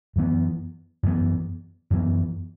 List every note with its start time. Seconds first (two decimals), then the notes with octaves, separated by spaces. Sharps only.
0.16 F#2 E3 B3
1.03 F#2 E3 B3
1.91 F#2 E3 B3